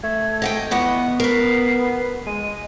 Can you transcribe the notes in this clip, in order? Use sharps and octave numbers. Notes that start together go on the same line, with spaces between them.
A3 G#6
D#5 F#5 G5
E2 B3 D#5 F#5 C#6
A#4 B4 C7
G#3 D#7